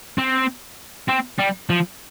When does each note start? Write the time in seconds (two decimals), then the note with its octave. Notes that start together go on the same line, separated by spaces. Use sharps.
0.18 C4
1.08 C4
1.39 G3
1.70 F3